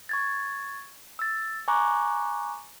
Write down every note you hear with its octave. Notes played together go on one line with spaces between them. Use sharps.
C#6 G#6 A6
E6 A6
G#5 A#5 C#6 D6 F#6